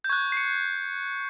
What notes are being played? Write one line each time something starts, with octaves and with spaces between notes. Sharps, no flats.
G6
C#6 F#6 G#6
C7
C#7